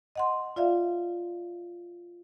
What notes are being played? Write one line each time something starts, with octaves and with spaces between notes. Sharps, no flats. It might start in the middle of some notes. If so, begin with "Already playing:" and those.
D#5 F#5 C6
F4 D5 E5 F5